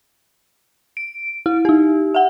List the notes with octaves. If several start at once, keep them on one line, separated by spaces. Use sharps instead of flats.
D7
E4
D#4 G4
E5 F#5